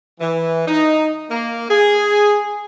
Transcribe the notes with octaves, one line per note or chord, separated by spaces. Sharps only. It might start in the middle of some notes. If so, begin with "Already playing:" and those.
E3
D#4
A#3
G#4